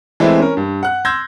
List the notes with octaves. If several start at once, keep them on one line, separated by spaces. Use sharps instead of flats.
E3 G#3 A3 C4 E4
C#4 A#4
G2
F#5 F#6
C6 E6 G6 G#6 A#6